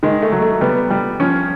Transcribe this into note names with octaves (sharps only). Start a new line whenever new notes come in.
D#3 G#3
A3
F#3
A3
G3 B3
G3
F3 C#4